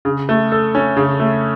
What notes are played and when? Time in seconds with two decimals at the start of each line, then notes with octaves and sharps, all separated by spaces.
0.05 C#3
0.29 A3
0.52 A4
0.75 C#4
0.97 C#3
1.20 A3